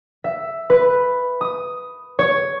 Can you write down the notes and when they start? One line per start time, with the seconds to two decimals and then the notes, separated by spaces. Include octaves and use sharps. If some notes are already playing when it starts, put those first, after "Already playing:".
0.24 E5
0.70 B4
1.41 D#6
2.19 C#5